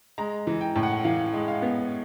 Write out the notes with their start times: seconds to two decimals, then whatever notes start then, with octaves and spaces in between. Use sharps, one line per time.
0.18 G#3 A#5
0.47 E3
0.61 G5
0.76 A2
0.83 F#5
1.04 E3 F5
1.33 G#3
1.48 F5
1.62 B3